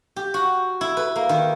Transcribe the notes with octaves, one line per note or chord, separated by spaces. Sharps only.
G4
F#4
E4
B4
A#3
D#3